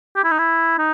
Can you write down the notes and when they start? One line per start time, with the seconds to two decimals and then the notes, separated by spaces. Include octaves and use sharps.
0.16 G4
0.24 E4
0.31 D#4
0.39 E4
0.78 D#4